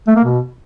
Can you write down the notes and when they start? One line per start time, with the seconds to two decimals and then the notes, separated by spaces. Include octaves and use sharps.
0.08 A3
0.16 A#3
0.24 B2